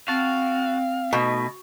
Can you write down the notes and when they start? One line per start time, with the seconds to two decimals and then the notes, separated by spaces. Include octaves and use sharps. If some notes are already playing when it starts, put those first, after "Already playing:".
0.08 C4 F#4 F5 A5
1.13 B2 A3 D#4